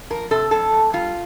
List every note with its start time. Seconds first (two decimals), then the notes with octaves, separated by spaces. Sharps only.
0.10 F3 A#4
0.31 C3 A4
0.51 F2 A4
0.72 F2
0.93 G3 F4